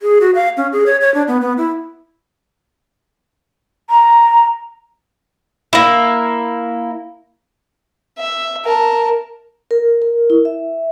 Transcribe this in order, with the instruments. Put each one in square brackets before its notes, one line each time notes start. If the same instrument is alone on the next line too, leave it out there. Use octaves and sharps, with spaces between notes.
[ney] G#4
F#4
F5
C#4
G#4
C#5
C#5
D4
B3
B3
E4
[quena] A#5
[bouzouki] A#3 E4
[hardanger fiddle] E5
A#4 A5
[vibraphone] A#4
A#4
E4
E5